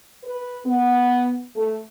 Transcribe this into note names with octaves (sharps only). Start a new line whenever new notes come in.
B4
B3
A3